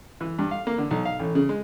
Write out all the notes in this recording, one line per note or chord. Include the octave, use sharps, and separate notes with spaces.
E3
G2
F5
A#3
D3
B1
F5
A1
C#3
G#3